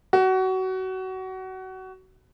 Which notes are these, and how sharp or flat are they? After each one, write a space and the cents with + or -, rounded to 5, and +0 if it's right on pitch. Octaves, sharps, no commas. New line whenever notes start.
F#4 +25